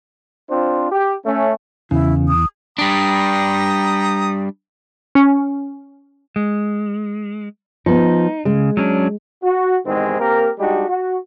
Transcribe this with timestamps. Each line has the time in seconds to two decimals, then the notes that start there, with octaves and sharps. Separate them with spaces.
0.50 C4 D4 F4 C5
0.91 G4
1.26 A3 C#4
1.91 E2 C#3 E4
2.29 D#6
2.78 G3 D4 G5 A#5 D#6
5.15 C#4
6.36 G#3
7.86 F3 B3 D#4
8.45 C#3 G#3
8.77 F#3 C#4 D4
9.43 F#4
9.86 E2 G#2 C3 D#3 G#3 C4
10.20 A#3 C4 G4 A#4
10.59 G3 G#3 D4 D#4 F#4 G4
10.89 F#4